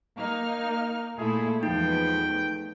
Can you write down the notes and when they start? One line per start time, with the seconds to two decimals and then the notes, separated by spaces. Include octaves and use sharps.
0.16 A#3 D#4 F6
1.18 A#2 A3 E4 G#4 A4
1.63 E2 F3 G#3 A3 B3 D#4 G5